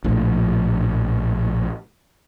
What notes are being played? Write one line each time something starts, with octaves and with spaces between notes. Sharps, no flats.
A#1 A2 F3